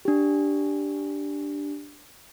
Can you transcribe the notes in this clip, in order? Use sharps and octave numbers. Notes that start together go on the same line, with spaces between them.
D4 G4